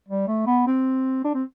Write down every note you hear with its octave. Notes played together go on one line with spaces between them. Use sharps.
G3
A3
B3
C4
D4
C4